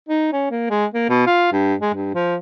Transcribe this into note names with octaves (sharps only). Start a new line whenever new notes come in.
D#4
C#4
A#3
G#3
A#3
B2
F4
G2
G#3
G2
F3